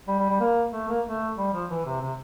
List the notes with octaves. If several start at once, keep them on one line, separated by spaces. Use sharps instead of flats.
G3
G3
G3
A#3
A3
A#3
A3
G3
F3
E3
C3
C3